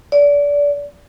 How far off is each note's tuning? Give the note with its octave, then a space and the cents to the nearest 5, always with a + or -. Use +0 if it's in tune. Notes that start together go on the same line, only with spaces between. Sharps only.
D5 -25